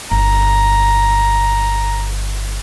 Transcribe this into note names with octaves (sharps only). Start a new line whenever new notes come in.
G1 A#5